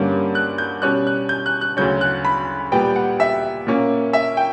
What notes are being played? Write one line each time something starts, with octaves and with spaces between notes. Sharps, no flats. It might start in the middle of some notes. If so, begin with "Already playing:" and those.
Already playing: G2 D3 G3 A#3 C#4
F#6
G6
B2 G3 C#4 F#6
F#6
G6
F#6
F#6
D2 C#3 F#3 C#4 G6
F#6
B5
A#2 G3 B3 G5
F#5
E5
A#2 A#3 C#4
E5
G5